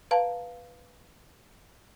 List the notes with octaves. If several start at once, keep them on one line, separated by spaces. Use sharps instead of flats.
B4 F5 A5 A#5